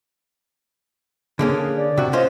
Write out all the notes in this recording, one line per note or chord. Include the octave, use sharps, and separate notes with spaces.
D3 A#3 C#4 G#4
D5
C3 F#4
C#4 F4 C5 D#5